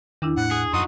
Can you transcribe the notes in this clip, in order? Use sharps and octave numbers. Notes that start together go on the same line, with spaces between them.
E2 D#3 D4 E4
A2 F#5
G#4
F#2 D#4 F#4 C6 D#6